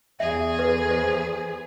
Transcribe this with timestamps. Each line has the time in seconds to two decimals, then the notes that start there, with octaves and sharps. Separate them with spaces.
0.20 E2 G#4 E5
0.59 A4 B4
0.91 C5